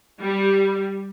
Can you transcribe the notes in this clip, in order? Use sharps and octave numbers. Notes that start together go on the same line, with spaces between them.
G3